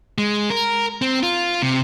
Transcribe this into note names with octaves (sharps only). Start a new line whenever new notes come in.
G#3
A#4
C4
F4
C3